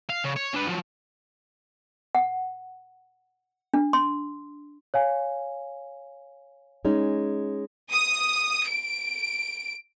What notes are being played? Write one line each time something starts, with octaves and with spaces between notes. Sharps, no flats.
F5
C#3
C#5
D4 B4
F3 F#3
F#5
D4
C6
C#5 F5 G#5
G#3 C#4 D#4
D#6
D7